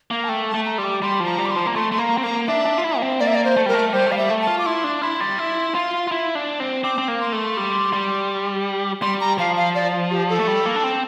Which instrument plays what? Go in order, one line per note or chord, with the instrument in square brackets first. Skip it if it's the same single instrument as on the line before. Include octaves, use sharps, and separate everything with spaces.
[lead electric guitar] A#3 [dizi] F5
[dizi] A5
[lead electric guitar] A3 [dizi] G5
[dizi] A5
[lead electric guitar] A3
[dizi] A#5
[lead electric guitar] G3 [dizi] C6
[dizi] D6
[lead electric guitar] G3 [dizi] C6
[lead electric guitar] F3
[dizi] A#5
[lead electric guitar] G3
[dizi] D6
C6
[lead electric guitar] F3
A#3
[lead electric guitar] A3 [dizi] C6
[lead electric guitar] A3 [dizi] C6
[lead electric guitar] A#3 [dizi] A#5
[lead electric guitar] C4
[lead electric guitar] A#3 [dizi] A#5
[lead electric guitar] D4 [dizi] E5
[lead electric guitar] D4
F4
E4
A#3
C4
[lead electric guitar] A#3 [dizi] D5
[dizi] E5
D5
C5
[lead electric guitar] A3
[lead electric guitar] G3 [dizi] A#4
[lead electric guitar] A3
[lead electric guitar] G3 [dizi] C5
[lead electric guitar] A3
[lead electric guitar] G3 [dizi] F5
[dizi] E5
[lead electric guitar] A3
[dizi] A5
[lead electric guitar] F4
[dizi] D6
[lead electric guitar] E4 [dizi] C6
[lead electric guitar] D4
[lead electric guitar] E4 [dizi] C6
[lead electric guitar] G3
E4
F4
F4
E4
D4
C4
[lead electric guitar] C4 [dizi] D6
[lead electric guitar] C4
A#3
[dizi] C6
[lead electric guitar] A3
G3
G3
[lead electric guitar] G3 [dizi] C6
[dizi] A#5
[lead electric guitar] F3 [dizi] F5
[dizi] F5
D5
G4
A4
[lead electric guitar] A3
G3
A#3
D4
C4